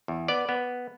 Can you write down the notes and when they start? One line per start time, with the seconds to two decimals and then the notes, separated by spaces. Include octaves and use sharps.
0.08 E2
0.28 B3 D5
0.49 B3